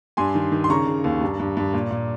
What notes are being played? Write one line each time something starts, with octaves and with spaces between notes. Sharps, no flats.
G2 G#5 C6
D#3
D#3
C6
C#3 A#5 C#6
C#3
D#2
G2
G2
G2
A#2
A#2